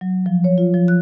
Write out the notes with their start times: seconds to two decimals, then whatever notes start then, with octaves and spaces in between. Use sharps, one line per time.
0.01 F#3
0.26 F3
0.44 C#5
0.58 F4
0.74 F3
0.88 F#6